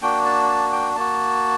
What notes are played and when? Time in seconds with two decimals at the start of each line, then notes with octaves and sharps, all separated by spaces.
0.02 A#3 D4 F#4 G5
0.25 A5
0.48 A5
0.72 G5
0.96 A#3 F#4 A5